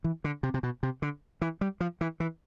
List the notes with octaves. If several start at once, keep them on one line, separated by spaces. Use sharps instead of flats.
E3
D3
C3
C3
B2
C3
D3
E3
G3
F3
E3
E3